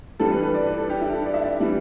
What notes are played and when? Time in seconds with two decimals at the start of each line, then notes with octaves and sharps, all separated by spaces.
0.20 G2 E3 G3 A4
0.31 B4
0.43 B4
0.55 D5
0.66 B4
0.78 A4
0.90 G4
1.01 E4
1.13 A4
1.26 D5
1.34 E5
1.43 D5
1.60 E3 G3